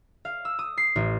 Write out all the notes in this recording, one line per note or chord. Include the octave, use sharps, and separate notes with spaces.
F5
E6
D#6
C7
A1